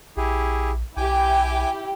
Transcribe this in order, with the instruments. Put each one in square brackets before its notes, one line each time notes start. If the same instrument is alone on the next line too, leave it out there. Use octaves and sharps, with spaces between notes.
[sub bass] A#1 [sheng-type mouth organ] E4 G4 G#4
[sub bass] B1 [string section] E4 G4 [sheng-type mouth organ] G5 G#5 D6